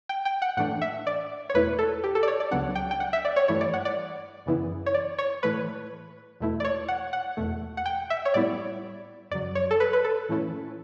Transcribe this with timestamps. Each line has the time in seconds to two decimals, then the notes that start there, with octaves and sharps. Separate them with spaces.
0.09 G5
0.25 G5
0.42 F#5
0.57 A2 E3 A3 D4 F#5
0.82 E5
1.07 D5
1.50 C#5
1.54 E2 B2 A3 E4 B4
1.79 A4
2.04 G4
2.15 A4
2.23 D5
2.28 C#5
2.40 D5
2.51 C#2 C#3 F#3 B3 D4 F#5
2.75 G5
2.91 G5
3.00 F#5
3.13 E5
3.25 D5
3.36 C#5
3.48 G2 E3 A3 E4 C#5
3.61 D5
3.74 F#5
3.85 D5
4.46 F#2 C#3 E3 B3 E4
4.86 C#5
4.94 D5
5.19 C#5
5.43 A2 E3 A3 B4
6.40 E2 B2 A3 E4
6.60 D5
6.65 C#5
6.88 F#5
7.13 F#5
7.37 E2 B2 A3
7.77 F#5
7.86 G5
8.10 E5
8.25 C#5
8.34 A2 G3 B3 E4 D5
9.31 F#2 C#3 F#3 D5
9.55 C#5
9.71 A4
9.80 B4
9.93 B4
10.04 A4
10.29 A2 E3 A3 C#4 E4